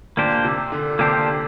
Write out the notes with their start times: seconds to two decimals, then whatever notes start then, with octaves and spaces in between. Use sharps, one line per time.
0.17 A#2 A#3 D4 G4 C5
0.45 C3
0.72 D3
0.99 C3 A#3 D4 G4 C5